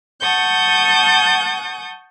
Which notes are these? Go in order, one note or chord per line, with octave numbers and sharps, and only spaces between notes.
F#5 A5 C#6 D#6 G6